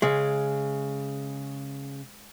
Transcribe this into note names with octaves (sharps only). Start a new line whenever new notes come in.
C#3 G#3